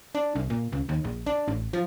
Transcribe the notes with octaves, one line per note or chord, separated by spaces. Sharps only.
D4
C2
A#2
C#2
D#2
A#1
D4
A1
F3